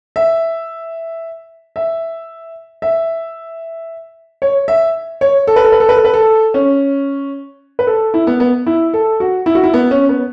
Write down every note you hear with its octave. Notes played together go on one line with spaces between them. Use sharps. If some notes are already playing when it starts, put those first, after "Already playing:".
E5
E5
E5
C#5
E5
C#5
A4
B4
A4
B4
A4
B4
A4
B4
A4
C#4
B4
A4
E4
B3
B3
E4
A4
F#4
E4
F#4
E4
B3
C#4
B3